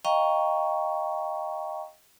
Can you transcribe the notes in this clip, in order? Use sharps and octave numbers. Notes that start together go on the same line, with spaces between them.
D#5 F5 G5 A#5 C#6